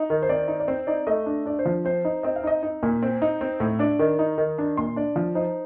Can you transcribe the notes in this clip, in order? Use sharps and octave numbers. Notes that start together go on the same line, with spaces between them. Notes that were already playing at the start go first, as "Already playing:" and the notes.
Already playing: D#4
D#3
C5
C4 D5
D#4
D5
C4 C5
D#4 D5
A3 D#5
D4
D4 D5
C5
F3
C4 C5
D#4
C4 D#5
F5
D#4 D#5
D#4
A#2
C4
D#4
C4
A2
D4 D5
D#3
D#4
D#3
D4
A#2 C6
D4 D5
F3
D#4 C5